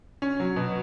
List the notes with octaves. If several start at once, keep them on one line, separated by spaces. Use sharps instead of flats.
C#4
F#3
B2